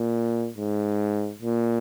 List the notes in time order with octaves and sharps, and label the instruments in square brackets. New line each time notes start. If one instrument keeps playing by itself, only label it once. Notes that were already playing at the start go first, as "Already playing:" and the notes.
Already playing: [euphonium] A#2
G#2
A#2